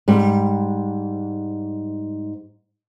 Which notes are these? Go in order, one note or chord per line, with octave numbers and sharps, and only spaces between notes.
G#2 G3